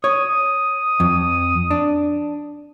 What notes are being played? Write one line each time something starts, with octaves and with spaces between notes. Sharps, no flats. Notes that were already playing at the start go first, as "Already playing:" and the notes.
C#5 D#6
F2
D4